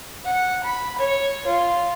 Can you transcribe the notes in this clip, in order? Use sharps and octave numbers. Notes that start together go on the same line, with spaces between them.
F#5
B5
C#5
F4